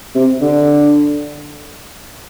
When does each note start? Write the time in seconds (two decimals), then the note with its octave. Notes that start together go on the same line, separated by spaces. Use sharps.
0.15 C3
0.41 D3